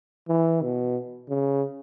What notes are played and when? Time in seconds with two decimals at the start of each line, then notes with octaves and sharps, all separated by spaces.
0.29 E3
0.63 B2
1.29 C#3